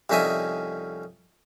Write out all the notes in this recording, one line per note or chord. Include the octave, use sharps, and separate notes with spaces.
C2 F2 C#4 D#4 E5 G#5